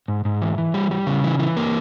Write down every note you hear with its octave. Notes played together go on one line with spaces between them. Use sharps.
G#2
G#2
E3
E3
G3
G3
C#3
E3
E3
A#3